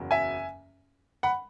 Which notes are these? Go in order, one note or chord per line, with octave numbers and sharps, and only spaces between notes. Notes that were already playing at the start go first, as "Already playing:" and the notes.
Already playing: F#1 E2 C#3 F#3
E5 G#5
F#5 B5